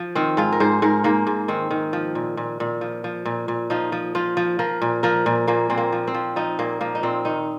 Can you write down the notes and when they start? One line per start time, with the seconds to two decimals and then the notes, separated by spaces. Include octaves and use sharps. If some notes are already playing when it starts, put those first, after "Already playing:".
Already playing: F3
0.15 D#3 C4
0.37 G#2 F4
0.52 A#4
0.60 G#2 C5
0.82 G#2 A#4
1.04 G#2 A#3
1.27 G#2
1.48 D#3 C4
1.71 D#3
1.93 F3
2.15 A#2
2.37 A#2
2.60 A#2
2.81 F3
3.04 F3
3.25 A#2
3.48 A#2
3.70 F3 D#4
3.92 F3
4.15 F3 F4
4.37 F3
4.59 F3 A#4
4.82 A#2
5.03 F3 A#4
5.26 A#2
5.47 A#2 A#3
5.70 A#2 C4
5.78 A#3
5.92 F3
6.07 C4
6.14 F3
6.36 F3 D#4
6.59 A#2 A#3
6.81 F3 A#3
6.95 D#4
7.03 A#2 C4
7.25 D#3 D#4